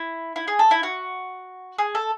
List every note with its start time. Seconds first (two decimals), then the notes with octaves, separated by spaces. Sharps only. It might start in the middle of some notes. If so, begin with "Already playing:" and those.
Already playing: E4
0.36 E4
0.48 G#4
0.59 A4
0.71 E4
0.83 F#4
1.78 G#4
1.95 A4